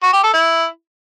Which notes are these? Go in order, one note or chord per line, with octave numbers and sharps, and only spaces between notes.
F#4
G4
A4
E4